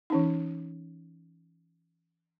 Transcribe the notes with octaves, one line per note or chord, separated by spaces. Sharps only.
E3 C#4 D#4